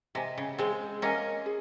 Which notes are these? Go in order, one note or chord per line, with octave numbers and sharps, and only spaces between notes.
C3 D#5 G#5
C#3
G#3 C4 G#4
A#3 C#4 D#5 G#5
G#4